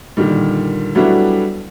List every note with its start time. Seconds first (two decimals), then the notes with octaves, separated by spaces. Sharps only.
0.17 A#2 D3 D#3 G3
0.95 F#3 G3 A3 B3 D4 E4